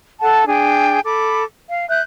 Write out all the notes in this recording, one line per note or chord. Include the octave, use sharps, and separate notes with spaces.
A4 F#5 A5
D4 G#4 G5
A4 B5 D6
F5
E5 F#6 G6